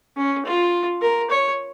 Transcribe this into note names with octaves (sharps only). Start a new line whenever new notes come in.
C#4
F4
A#4
C#5